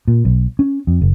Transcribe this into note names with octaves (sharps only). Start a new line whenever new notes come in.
A#2
B1
C#4
F2
F#1